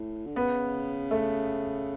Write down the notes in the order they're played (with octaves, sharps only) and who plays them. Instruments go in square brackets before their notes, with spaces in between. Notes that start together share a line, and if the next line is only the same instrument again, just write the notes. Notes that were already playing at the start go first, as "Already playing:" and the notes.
Already playing: [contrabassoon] A2
D3
[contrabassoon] C#3 [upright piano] B3
[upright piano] A3